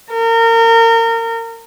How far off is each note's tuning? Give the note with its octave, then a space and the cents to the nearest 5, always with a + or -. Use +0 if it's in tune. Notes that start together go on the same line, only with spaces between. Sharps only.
A#4 -30